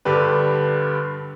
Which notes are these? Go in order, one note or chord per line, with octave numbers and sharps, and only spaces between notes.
G2 D3 D4 G4 B4